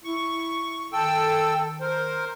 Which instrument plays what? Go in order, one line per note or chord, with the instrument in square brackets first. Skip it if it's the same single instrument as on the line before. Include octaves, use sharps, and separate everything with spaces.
[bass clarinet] E4 [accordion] C#6
[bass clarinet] D#3 [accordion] A4 G5 E6
[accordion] A#4 C5